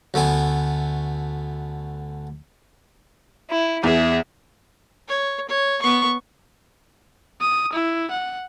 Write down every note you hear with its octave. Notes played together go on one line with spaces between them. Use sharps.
D2 A3 B3 G#5
E4
E2 G#4 E5
C#5
C#5
B3 C#6
D#6
E4
F#5